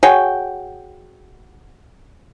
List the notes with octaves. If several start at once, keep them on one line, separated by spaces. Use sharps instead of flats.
F#4 G#4 C#5 G5